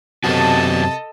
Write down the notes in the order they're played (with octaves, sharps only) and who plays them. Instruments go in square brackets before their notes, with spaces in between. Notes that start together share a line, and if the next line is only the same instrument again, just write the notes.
[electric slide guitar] F#2 B3 F#4 [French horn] C3 [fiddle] A4 D#5 [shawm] A5